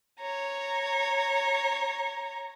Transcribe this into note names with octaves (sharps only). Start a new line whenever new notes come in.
C#5 A#5